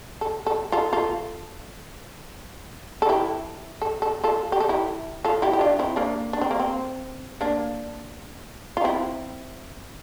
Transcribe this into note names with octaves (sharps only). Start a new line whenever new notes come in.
A4
A4
F4 A4
F4 A4
A4
E4 G4
A4
A4
F4 A4
G4
A4
E4 G4
F4 A4
E4 G4
G4
D4 F4
C4 E4
A#3 D4
D4
C4
A#3
C4
A#3 D4
F4
C4 E4